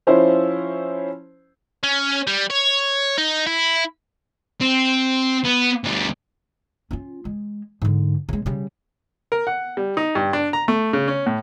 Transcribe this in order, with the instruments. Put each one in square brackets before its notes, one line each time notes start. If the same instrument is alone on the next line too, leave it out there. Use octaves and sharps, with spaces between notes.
[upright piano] F3 C#4 E4 C5
[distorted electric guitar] C#4
G3
C#5
D#4
E4
C4
B3
D2 G3
[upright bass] C#4 F4
G#3
G#2 D3
C#3 G#3
C#3 G3
[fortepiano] A#4
F#5
G3
D#4
G2
D4
A#5
A3
C#3
C#4
A2